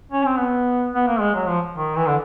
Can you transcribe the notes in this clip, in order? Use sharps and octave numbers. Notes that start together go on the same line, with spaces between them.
C#4
C4
B3
B3
A#3
G#3
F#3
F3
D#3
E3
D3